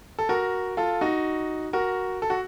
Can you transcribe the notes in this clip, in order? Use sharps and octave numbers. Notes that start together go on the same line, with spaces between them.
A4
F#4 A#4
F4 A4
D#4 F#4
F#4 A#4
A4
F#4